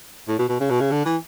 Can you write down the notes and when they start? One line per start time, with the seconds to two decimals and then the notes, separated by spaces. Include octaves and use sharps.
0.28 A2
0.39 B2
0.49 B2
0.60 C#3
0.70 B2
0.80 C#3
0.91 D3
1.05 E3